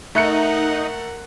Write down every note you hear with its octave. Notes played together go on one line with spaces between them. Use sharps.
A3 D#4 A#4 E5 F#5 F#6 C#7